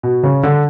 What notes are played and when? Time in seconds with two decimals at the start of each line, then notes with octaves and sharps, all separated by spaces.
0.03 B2
0.23 C#3
0.43 D3